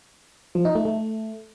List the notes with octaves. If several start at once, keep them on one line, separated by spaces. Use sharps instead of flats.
F3
D#4
A3
A3